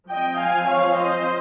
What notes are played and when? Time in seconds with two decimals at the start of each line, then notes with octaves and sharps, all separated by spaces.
0.10 F3 C4 D#5 G5
0.39 F5 G#5
0.68 C#5 F5
0.97 C5 D#5